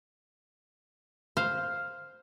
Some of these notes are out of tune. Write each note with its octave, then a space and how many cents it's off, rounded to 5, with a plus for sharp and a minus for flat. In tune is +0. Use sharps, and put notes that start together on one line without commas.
C5 +0 F5 +0